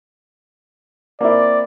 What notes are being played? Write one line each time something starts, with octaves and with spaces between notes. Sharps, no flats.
A#3 C4 E4 D5